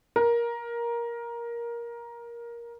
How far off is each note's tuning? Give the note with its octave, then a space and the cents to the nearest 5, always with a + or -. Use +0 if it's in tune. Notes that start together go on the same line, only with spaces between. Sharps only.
A#4 +15